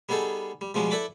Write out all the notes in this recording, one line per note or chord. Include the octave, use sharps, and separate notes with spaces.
G3 B3 D#4 G#4 A4
G3
B2 F3 G3 G#3 C#4
E4 A4 B4 D5 B5 D6